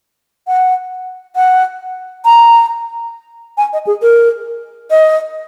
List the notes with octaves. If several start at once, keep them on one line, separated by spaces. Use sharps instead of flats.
F#5
F#5
A#5
G#5
D#5
G#4
A#4
D#5